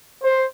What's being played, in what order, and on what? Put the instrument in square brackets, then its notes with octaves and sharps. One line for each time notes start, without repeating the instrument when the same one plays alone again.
[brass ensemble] C5